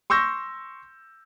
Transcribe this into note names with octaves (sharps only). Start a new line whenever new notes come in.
C6 C#6 E6 G6 A#6